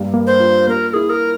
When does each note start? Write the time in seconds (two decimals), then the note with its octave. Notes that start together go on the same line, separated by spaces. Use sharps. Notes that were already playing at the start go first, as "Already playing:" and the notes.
Already playing: G2 G3 A#3
0.14 A#3
0.27 C5
0.40 F4
0.68 A#3 A#4
0.89 A#4
0.94 E4 G#4
1.10 A#4